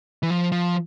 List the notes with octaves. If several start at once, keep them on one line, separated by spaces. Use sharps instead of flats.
E3
F3
F3